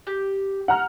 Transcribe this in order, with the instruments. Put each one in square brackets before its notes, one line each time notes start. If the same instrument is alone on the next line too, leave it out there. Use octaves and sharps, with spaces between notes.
[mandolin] G4
[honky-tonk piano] F#5 A#5 F6